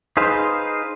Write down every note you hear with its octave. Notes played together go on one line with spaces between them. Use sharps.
D#4 G#4 B4 C5 F5